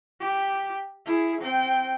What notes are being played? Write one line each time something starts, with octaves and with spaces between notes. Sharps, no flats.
G4
E4 G#4
C4 G5